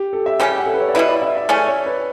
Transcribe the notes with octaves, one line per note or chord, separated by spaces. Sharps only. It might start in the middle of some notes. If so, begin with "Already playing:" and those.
Already playing: G4
A4
E5
C#3 G3 C#4 G4 G5
F#5
A4
B4
C#5
D5
B2 A3 E4 B4 E5
D5
E5
E5
C#3 E3 A3 C#4 D5
C#5
B4